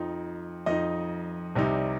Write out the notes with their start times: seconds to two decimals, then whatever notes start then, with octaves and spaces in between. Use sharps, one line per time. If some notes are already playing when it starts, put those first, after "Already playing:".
Already playing: F2 F3 D#4
0.66 F2 F3 D#4 D#5
1.55 C2 C3 G3 D#4